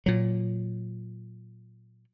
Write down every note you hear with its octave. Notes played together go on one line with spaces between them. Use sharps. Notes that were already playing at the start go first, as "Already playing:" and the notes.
A#2 F#3